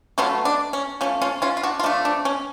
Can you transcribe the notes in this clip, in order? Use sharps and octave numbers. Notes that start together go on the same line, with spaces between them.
B2 F#3 A3 C#4 F4
D4
C#4
F3 A3 C#4
C#4 F4
C#4 F4
F4
D4 F#4
F4
F3 A3 D4
D4
C#4